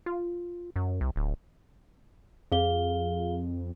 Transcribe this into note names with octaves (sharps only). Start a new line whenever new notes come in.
F4
F#2
C2
D1
F2 G#4 F5 G7